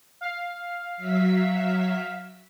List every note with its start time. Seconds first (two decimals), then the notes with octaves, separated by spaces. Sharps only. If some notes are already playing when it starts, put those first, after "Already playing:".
0.21 F5
0.97 F#3 E5 B6